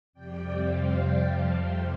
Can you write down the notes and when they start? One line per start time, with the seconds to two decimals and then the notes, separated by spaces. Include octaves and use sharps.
0.13 F2 C3 G3 D5 G5
0.55 C5 F5
0.97 D5 G5
1.26 F5 A5
1.55 G5 C6